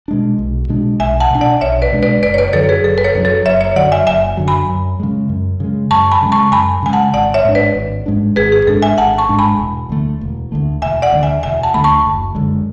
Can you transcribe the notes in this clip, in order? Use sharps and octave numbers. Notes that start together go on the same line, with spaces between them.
B2 G#3 D4
B1
B2 G#3 D4
B1 E5 G#5
F#5 A5
B2 G#3 D4 G#5
D5 F#5
B1 C#5 E5
B4 D5
B2 G#3 D4
B4 D5
F#1 B4 D5
C#5
B4 D5
F#2 D3 F#3 A4 C#5
G#4 B4
F#1 A4
B4
A4 C#5
F#2 D3 F#3
A4 C#5
F#1 C#5 E5
C#5 E5
F#2 D3 F#3 D5 F#5
E5 G#5
F#1 E5 G#5
F#2 D3 F#3
G#5 B5
F#2
C#3 G#3
F#2
C#3 G#3
F#2 A5 C#6
G#5 B5
C#3 G#3
A5 C#6
F#2 G#5 B5
C#3 G#3 G#5
F#5 A5
G#1 D5 F#5
C#5 E5
G#2 G#3 D4
B4 D5
G#1
G#2 G#3 D4
G#1 G#4 B4
G#4
G#2 G#3 D4 A4
E5 G#5
G#1 F#5 A5
A5 C#6
G#2 G#3 D4
G#5 B5
E1
D2 D3 A3
E1
D2 D3 A3
E1 E5 G#5
D5 F#5
D2 D3 A3
E5 G#5
E1 E5 G#5
F#5 A5
D2 D3 A3 B5
A5 C#6
F#1
F#2 D3 G#3